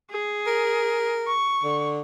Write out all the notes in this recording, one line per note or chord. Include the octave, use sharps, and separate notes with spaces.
G#4
A#4
C#6
D3